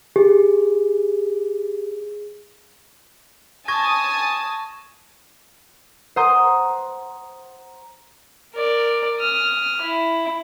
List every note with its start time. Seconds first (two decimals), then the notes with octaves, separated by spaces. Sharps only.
0.16 G4 G#4
3.68 G#5 A5 C#6 D#6 G#6 A#6
6.16 C5 F#5 A#5 C6 D#6 G6
8.55 A#4 D5
9.20 D#6 F6
9.82 E4